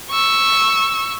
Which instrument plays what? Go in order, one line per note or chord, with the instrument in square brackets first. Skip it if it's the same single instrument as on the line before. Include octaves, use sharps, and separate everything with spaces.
[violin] C#6 E6